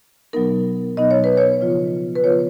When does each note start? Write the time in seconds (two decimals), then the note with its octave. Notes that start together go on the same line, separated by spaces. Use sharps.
0.33 B2 F#3 B3 D#4 A#4
0.97 B2 F#3 B3 D#4 D#5
1.11 C#5
1.24 B4
1.37 C#5
1.61 C#3 F3 B3 F4
2.15 B4
2.24 C#3 F3 B3 F4 C#5